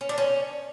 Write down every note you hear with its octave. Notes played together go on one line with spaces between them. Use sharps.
C#4
D4
C#4